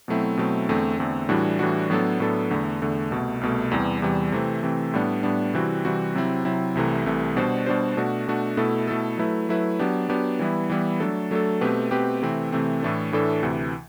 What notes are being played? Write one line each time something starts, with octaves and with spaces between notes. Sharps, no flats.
B2 F#3 A3 C4 E4
B2 F#3 A3 C4 E4
E2 D3 A3 C4
E2 D3 A3 C4
A2 E3 G3 D4 F#4
A2 E3 G3 D4 F#4
A2 F#3 B3 D4 A4
A2 F#3 B3 D4 A4
E2 D3 A3
E2 D3 A3
C2 B2 A3
C2 B2 A3
E2 C3 E3 G3
E2 C3 E3 G3
C3 E3 A3 C4
C3 E3 A3 C4
A2 G3 B3 D4
A2 G3 B3 D4
C3 E3 G3 C4 F#4
C3 E3 G3 C4 F#4
C3 F#3 C4 E4
C3 F#3 C4 E4
C2 C3 E3 A3
C2 C3 E3 A3
B2 G3 D4 F#4 C5
B2 G3 D4 F#4 C5
B2 A3 D4 F#4
B2 A3 D4 F#4
B2 A3 E4 A4
B2 A3 E4 A4
F#3 A3 E4 B4
F#3 A3 E4 B4
F#3 B3 D4 G4
F#3 B3 D4 G4
E3 G3 B3 E4
E3 G3 B3 E4
F#3 A3 D4 A4
F#3 A3 D4 A4
B2 A3 C4 G4 B4
B2 A3 C4 G4 B4
C3 E3 A3 C4
C3 E3 A3 C4
A2 E3 A3 D4 A4
A2 E3 A3 D4 A4
D2 C3 E3